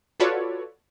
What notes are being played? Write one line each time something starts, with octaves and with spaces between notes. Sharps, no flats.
F4 F#4 A4 B4 C#5 D5